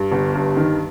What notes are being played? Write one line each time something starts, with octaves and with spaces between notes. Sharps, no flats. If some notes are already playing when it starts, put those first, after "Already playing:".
Already playing: G2
G1
G2
D#3